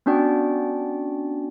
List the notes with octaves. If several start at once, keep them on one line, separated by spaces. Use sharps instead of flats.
B3 C#4 D4 F#4 D5 G5